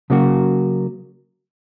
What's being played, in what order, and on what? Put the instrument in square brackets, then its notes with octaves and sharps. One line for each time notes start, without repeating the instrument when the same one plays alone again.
[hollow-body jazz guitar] C#3 F#3 A#3 F#4